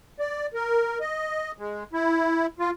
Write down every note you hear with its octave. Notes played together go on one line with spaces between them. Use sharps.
D5
A#4
D#5
G#3
E4
F4